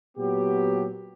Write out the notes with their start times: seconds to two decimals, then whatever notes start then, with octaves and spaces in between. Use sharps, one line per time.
0.18 A#2 F#3 B3 G4